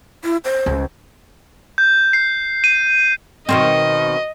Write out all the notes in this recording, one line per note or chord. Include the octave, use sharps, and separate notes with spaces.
E4
C5
C#2
G6
C7
D#7
B2 D#3 C4 D#5